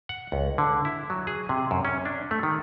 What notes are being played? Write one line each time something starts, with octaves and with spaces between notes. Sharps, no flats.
F#5
C#2
D3
E4
F#3
G#4
C3
F#2
C#4
D4
A3
D#3